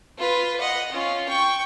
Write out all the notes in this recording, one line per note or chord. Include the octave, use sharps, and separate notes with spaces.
F4 B4
D#5 F#5
C#4 F4
G5 C#6